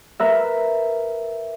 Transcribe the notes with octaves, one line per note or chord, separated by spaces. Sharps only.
A#4 B4 E5